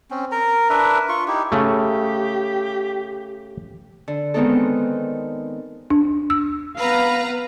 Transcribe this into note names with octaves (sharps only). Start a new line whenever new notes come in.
C4 C#4
A#4 A#5
D4 A#4 B4 E5
F4 C#6
D#4 E4 G4
C#3 A3 G4
D3
D#3 G#3 B3 C4 D#4 A4
D4
E6
B3 B4 F5 A#5